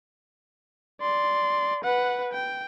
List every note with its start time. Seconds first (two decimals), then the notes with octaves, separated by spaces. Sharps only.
1.01 D5 C6
1.84 B4 F#5
2.33 G5